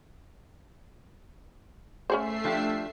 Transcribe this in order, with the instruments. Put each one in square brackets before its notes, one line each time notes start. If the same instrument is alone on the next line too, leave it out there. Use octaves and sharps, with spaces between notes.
[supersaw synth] A3 E5 C7 [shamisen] C#4 G#4 C5
[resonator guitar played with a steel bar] F3 D4 G4